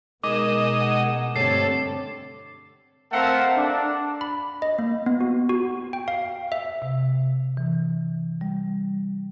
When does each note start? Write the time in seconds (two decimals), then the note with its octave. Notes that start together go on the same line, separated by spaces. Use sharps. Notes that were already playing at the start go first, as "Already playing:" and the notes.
0.24 B2 G#3 D#4 A#4 D#5 D6
0.80 F#5
1.36 G2 D3 A3 C4 A4 C#5 C7
3.12 A3 C4 A4 A#4 F5 F#5
3.57 D4
4.21 B5
4.62 D#5
4.79 A#3
5.06 B3
5.21 F#4
5.49 F#4
5.93 G5
6.08 F5
6.52 E5
6.82 C3
7.57 E3
8.41 G3